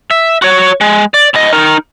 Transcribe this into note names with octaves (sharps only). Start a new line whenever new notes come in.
E5
F#4 C#5
G#3
D5
A2 D#5
D#4 A#4